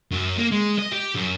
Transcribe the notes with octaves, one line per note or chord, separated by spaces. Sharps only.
F#2
A#3
G#3
D#5
G4
F#2